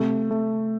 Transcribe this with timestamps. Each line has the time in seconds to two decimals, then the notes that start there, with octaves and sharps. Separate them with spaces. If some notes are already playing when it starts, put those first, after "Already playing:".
Already playing: C3 A3
0.31 A3